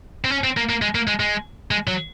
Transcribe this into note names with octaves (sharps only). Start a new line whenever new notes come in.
C4
C#4
C4
A#3
A#3
G#3
A#3
G#3
G#3
G#3
F#3